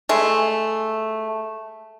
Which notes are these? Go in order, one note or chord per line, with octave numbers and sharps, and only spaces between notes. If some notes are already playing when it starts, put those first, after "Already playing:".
G#3 A3